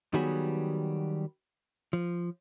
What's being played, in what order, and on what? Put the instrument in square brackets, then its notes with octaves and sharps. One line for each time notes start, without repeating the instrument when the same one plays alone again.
[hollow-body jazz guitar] D#3 F#3 G3 B3 F#4 G#4
F3